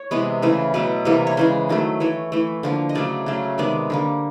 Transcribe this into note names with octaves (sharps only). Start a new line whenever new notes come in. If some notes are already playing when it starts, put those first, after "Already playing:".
Already playing: C#5
C3 E3 G#3 B3
C#3 E3 A3
B2 F#3 A3 B4
C3 E3 G3 A#3
C#5
C#3 E3 G#3 C5
D#3 F#3 A3
E3 A3 C#5
E3 A3
D3 F3 A#3
D#5
C#3 F#3 A3 D5
C#3 F#3 A3
C3 D#3 G#3 B3 D5
D3 G3 A#3